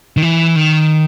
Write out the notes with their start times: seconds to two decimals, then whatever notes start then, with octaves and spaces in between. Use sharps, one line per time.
0.17 D#3
0.23 E3
0.56 D#3